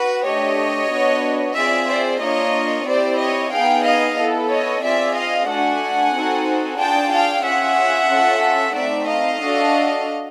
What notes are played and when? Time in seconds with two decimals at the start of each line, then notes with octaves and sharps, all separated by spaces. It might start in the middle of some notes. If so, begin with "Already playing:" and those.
Already playing: F#4 B4
0.25 A3 D4 G4 C#5 D#5
0.91 B3 D4 F#4
1.56 C4 F4 G#4 D5 E5
1.88 C5 D5
2.21 A#3 D4 F4 C#5 D#5
2.87 C4 E4 G4 C5 D5
3.19 C#5 D#5
3.52 B3 D#4 G#4 F5 G5
3.84 D#5 F5
4.18 B3 E4 A4
4.50 C#5 D#5
4.82 C4 F4 G#4 D5 E5
5.15 D#5 F5
5.48 A3 D4 F#4 A4 F#5 G#5
6.14 C4 D#4 F#4 A4
6.79 D4 F4 G#4 G5 A5
7.12 F5 G5
7.44 C#4 F4 G#4 E5 F#5
8.09 C#4 F4 A4
8.75 A3 C4 D#4 D5 E5
9.08 D#5 F5
9.41 D4 F#4 A4